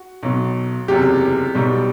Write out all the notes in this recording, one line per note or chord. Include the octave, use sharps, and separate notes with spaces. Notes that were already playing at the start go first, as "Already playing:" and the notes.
Already playing: F#4
B1 B2 F#3
F#1 E2 C3 F#3 G4
B1 B2 G3